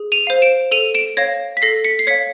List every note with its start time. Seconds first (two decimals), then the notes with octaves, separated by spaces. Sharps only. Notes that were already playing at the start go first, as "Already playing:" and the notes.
Already playing: G#4
0.12 D#7 F7
0.27 C5 F5
0.42 D7 E7
0.71 A4 D#7 F7
0.94 D7 E7
1.17 C#5 F5 G#6 A#6
1.57 B6
1.62 A4 A#6 C7
1.84 B6 C#7
1.99 C7
2.07 C#5 F5 B6 C#7